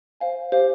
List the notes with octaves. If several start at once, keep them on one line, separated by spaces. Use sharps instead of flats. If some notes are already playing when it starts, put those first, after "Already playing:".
C5 F5 G#5
G4 C5 F5